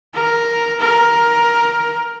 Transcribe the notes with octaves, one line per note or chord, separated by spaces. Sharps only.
A#4
A#4